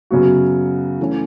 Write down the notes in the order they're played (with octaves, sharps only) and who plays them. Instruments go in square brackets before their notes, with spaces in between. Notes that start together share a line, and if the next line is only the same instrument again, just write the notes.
[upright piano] F#2 C#3 F#3 B3 F#4
E3 A3 C#4